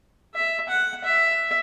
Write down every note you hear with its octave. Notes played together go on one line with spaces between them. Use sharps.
E5
F#5
E5